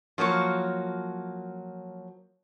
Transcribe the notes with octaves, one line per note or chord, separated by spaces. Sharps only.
F3 F#3 A#3 C#5